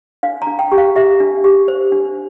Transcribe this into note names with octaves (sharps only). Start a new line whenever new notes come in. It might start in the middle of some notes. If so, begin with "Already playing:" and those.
D4 F5
A#5
D4
G5
G4
F5
G4 E5
D4
G4
C5
D4